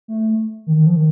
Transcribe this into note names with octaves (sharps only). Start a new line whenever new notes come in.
A3
D#3
D#3
F3
D#3